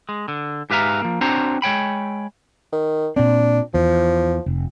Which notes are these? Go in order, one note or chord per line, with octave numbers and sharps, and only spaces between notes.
G#3
D3
G#2 G4 B4 E5 F5 A#5
F3 A#3
C4 D4 F#4 C5 C#5 A#5
G#3 C#5 G5 B5
D#3
A#2 C4 D4
E2 F3
F1